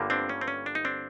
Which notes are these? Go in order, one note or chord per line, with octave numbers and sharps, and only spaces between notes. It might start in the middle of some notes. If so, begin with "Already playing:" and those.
Already playing: G1 G2 D3 G3 A#3
C4 D4
C#4
C4
C#4
D4
D#4
C4 D4